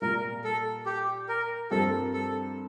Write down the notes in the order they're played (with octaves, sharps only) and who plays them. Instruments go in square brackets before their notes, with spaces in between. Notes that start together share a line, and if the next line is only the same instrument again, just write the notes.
[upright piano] A#2 G3 A#3 F4 [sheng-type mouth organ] A#4
[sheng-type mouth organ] A4
G4
A#4
[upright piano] G2 F3 C4 G4 A#4 [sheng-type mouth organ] A4
[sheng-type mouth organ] A4